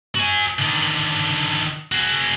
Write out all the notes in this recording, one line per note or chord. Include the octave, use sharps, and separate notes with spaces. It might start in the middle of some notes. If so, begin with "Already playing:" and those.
F#4 G#5
D3 D#3
F#4 G#4